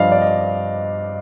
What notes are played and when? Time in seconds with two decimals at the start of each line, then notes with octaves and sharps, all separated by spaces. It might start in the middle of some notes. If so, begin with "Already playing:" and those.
Already playing: G2 F3 D5 D#5 F5
0.12 D5
0.22 D#5